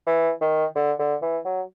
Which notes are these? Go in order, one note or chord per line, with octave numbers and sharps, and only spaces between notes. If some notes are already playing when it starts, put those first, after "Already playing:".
E3
D#3
D3
D3
E3
F#3